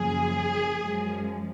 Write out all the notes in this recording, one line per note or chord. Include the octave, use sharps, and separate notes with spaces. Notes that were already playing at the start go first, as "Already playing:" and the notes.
Already playing: F#2 C#3 F3 A#3 G#4
F#2 F3 G#3